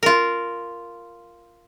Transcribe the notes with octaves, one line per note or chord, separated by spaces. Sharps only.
F4 A#4